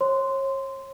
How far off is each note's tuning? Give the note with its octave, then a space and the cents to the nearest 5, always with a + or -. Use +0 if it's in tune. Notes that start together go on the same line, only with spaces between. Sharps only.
C#5 -40 C6 -10